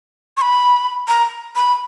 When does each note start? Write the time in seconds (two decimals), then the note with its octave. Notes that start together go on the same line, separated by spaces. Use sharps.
0.37 C#6
0.41 B5
1.08 A#5
1.56 B5